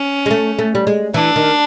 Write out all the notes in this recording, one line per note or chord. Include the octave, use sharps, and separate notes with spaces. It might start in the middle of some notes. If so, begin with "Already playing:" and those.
Already playing: C#4
G#3
A3
A3
G3
G#3
E3 D4
D#3